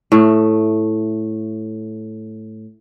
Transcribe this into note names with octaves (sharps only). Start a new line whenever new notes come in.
A2 A3